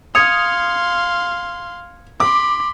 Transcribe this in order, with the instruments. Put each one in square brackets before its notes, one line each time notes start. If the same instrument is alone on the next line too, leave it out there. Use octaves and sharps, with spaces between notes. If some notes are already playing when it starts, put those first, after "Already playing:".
[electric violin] F5 C6 [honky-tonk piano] D#6 [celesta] G#6 C#7 F7
[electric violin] B5 C6 [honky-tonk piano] D6